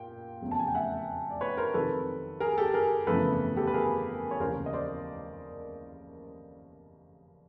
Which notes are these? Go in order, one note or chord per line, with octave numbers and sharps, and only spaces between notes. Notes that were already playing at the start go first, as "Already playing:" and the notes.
Already playing: A#2 G5
F1 E2 C#3 F#3 A3
A5
G#5
G5
E5 F#5
D5
B4 C#5
A#4 C5
F2 C3 D#3 F#3 A4 B4
G#4 A#4
G4 A4
G#4 A#4
G1 F2 C#3 E3 A3 A4 B4
G4 A4
B4
G#4 A#4
C#5
F1 D#2 C#3 E3 A#4 C5
D#5
C5 D5